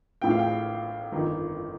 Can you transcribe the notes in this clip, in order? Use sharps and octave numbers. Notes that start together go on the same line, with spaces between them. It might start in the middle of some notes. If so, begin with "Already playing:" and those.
A1 A2 F3 G5
F5
G5
G1 F2 D#3